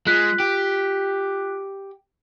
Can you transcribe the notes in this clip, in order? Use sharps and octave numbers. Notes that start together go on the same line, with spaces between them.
G#3 F4 F#6 B6
G4